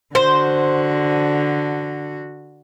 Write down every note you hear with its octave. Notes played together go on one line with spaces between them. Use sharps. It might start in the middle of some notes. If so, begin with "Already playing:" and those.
D3 F#4 C5